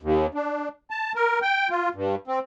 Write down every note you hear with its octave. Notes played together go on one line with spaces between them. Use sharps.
D#2
D4
A5
A#4
G5
F4
G2
C4